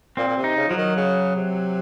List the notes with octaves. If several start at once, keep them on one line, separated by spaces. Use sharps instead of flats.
A#2 C4
A#2
C3
D#4
C#3
F3 F#3
D#3
C#3
C3